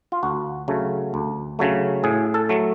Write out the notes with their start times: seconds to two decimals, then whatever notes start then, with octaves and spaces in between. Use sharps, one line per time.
0.12 F4
0.23 D2 F#4
0.68 C#3 F#3 A3
1.14 D2
1.59 C#3 F#3 A3
2.04 A2 G#4
2.34 A4
2.49 F#3 A3